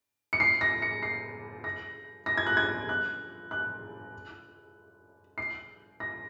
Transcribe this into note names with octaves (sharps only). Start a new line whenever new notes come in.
C#7
C7
A#6
C#7
C7
A#6
A#6
G#6
F#6
G#6
F#6
F#6
C7
A#6